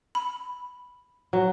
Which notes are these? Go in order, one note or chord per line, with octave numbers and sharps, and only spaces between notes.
B5
F#3